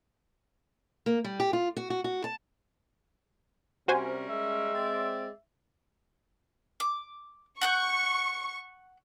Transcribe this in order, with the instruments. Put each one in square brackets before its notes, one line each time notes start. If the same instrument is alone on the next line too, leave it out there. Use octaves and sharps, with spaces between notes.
[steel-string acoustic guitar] A#3
G3
G4
F4
F#4
F#4
F#4
A5
[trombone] C3 [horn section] G3 C#4 A#4 [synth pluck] F#4 C5 G#5
[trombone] G#3 [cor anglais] E5
[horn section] C4 D5
[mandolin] D6
[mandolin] F#5 F#6 G6 [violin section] C#6